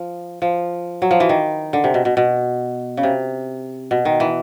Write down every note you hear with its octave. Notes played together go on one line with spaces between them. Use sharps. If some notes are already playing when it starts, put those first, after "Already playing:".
Already playing: F3
F3
F#3
F3
E3
D#3
D3
C3
B2
B2
B2
C#3
C3
B2
D#3
E3